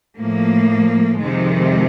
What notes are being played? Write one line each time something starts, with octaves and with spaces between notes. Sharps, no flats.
A2 F3 A#3
F2 C3 D#3 G#3